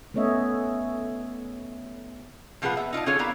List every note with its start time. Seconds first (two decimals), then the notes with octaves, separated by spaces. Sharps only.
0.14 A3 B3 C#4 C#5 D#5 E5
2.62 A#2 F3 F4 G#4 B4 F#5
2.77 B3 E5
2.93 D#4 F4 D5 A5
3.06 D3 C#4 F4 G#4 C#5 F5
3.19 B3 E4 A#4 D5 F5 A#5